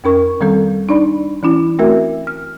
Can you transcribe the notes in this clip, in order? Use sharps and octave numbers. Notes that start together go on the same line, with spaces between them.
F2 C#4 A#4 C#6
D#3 G3 C4 A4
D4 D#4 D5 B5
E3 C#4 E4
A3 C4 F#4 A#4 E5
F6